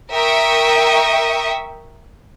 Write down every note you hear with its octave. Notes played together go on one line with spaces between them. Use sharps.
A#4 E5 G5 C#6 D#6